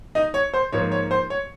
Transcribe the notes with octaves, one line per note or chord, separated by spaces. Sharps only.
D#4 D#5
C#5
C5
G#2 F3 A#3 C#5
C#5
C5
C#5